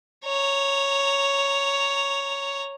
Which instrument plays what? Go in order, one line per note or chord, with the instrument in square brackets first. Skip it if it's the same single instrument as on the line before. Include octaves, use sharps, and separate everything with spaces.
[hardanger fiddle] C#5 A#5